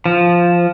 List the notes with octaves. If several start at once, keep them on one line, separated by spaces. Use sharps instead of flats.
F3